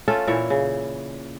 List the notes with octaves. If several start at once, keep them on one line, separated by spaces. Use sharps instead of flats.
A3 C#4 F4 A4
A#2 E3 E4 C#5
C#3